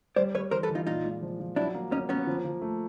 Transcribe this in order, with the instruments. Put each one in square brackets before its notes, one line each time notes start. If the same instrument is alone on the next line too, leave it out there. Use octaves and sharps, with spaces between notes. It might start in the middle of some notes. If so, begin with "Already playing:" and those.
[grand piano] G3 [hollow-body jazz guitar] C5 D5
[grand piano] G3 [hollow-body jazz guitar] B4 C#5
[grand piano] E3 [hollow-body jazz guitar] A#4 C5
[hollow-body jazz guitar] A4 B4
[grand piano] E3
[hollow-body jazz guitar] D#4 F4
[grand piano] A#2 [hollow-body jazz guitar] D#4 F4
[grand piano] G#3
F3
F3
[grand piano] F#3 [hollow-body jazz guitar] D4 E4
[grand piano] A#3
[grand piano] A#3 [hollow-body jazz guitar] C#4 D#4
[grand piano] A#3 [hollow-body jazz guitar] B3 C#4
[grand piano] F3
F3
A3